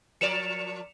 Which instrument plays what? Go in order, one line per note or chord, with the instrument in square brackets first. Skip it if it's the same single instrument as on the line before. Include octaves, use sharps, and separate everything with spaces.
[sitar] F3 A#4 D5 [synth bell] C#7 E7 F7